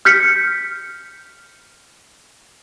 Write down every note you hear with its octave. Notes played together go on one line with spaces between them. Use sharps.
F6 G6 B6 C#7